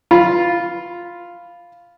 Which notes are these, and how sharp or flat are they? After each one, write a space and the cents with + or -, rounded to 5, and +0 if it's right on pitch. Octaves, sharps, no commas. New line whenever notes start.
F4 +0 B5 +0